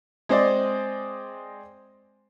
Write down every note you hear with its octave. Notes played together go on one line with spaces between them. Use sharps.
G#3 C4 C5 D5 D#5